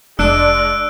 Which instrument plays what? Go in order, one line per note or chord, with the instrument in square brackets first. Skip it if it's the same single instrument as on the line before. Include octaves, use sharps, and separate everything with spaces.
[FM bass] F1 [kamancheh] G#3 D5 [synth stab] D4 [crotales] E6 F#6 D7